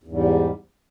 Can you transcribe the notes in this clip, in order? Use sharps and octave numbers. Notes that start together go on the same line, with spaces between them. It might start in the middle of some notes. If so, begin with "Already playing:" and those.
E2 G#2 G3